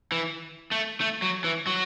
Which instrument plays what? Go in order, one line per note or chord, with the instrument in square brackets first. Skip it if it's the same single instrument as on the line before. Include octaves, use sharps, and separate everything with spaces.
[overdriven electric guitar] E3
A3
A3
F#3
E3
F#3